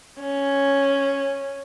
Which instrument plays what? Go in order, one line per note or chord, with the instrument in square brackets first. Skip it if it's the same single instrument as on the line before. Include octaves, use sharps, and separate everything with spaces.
[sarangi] C#4